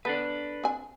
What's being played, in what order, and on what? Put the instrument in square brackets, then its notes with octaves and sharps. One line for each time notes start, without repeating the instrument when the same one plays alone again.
[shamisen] B3 [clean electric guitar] D4 A4 B4
[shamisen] C4 G#5